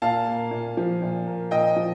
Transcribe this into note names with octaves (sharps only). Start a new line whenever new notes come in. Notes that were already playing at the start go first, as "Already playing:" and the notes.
A#2 F5 A5
A#3
A#2
F3
A#2
A#3
A#2 D#5 G5
F3